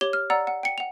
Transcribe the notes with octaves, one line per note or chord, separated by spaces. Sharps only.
G4 C#5 G7
F6
D5 F#5 A#5 E6
F#5
G5 C#7
F#5 F7